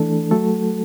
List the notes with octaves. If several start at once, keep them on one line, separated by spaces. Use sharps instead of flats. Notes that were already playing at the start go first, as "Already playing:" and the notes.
Already playing: E3 A3 D4 A4
F#3 A3 F#4 A4